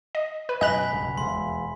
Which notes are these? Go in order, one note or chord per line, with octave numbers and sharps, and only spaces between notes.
D#5
B4
F#2 B2 D#5 G#5 B5 F#6 B6
B1 G2 C#3
E1 D#2 G#3 C6